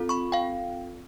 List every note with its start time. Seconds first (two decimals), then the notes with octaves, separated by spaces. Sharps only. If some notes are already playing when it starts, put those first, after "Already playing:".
Already playing: C4 F4 A4
0.09 B5 C#6
0.32 F5 G5